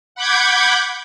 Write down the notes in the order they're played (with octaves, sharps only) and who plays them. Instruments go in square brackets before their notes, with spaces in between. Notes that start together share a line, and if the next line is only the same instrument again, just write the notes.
[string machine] F#5 B5 D6 G6 G#6